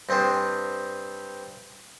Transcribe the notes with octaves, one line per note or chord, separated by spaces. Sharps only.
G2 C4 D4 G#4 C5